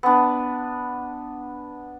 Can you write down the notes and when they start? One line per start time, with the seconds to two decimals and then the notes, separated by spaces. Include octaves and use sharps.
0.03 B3 D4